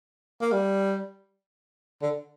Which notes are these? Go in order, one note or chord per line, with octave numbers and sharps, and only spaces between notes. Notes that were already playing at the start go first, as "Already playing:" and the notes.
A#3
G3
D3